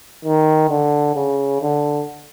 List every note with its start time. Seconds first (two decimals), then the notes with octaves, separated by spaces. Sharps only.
0.25 D#3
0.70 D3
1.16 C#3
1.62 D3